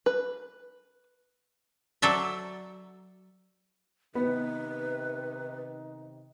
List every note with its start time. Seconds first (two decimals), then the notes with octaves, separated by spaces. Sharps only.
0.06 B4
2.02 F#3 A4 C5 D5 E5
4.15 C3 D#3 B3 D#4 B4